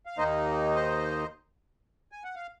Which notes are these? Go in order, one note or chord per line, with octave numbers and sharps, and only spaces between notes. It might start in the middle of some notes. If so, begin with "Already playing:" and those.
F5
D#2 D#3 A#3 D#4 C5 D#5
C5 D#5
G#5
F#5
F5